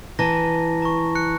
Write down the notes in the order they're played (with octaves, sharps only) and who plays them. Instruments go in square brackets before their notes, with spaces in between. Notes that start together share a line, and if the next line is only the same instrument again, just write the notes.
[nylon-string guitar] E3 [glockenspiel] A5 A#5 A#6
[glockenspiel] A#5 C#6
F#6 C#7